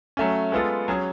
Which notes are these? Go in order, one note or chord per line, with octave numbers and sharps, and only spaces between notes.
F#3 A3 C#4
G#3 B3 F4 A4
F#3 C#4 G#4